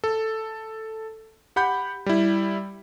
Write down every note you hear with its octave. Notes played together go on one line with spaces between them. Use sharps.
A4
G4 F#5 B5 G6
G3 E4